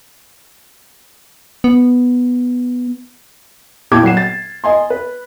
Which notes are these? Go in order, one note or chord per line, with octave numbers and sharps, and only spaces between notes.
B3
A#2 E4 G4 A5 D6 G#6
F#3 F#5 C7 E7
A6
D#5 G#5 C6
B4